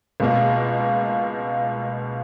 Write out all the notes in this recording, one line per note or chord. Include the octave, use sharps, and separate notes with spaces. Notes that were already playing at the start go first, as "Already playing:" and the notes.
C#2 B2 A#3